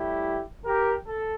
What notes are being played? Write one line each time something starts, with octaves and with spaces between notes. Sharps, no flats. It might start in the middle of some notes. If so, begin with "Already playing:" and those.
Already playing: A2 G3 E4 G4
G4 A#4
A4